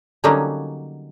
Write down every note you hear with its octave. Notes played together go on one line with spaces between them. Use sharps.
D3 F#3 G3 A#3 C#4 D#4